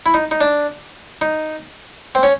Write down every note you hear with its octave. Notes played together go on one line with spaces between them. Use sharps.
E4
D#4
D#4
D4
D#4
C4
C#4